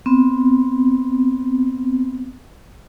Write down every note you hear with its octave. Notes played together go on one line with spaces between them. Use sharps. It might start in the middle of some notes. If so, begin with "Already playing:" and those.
B3 C4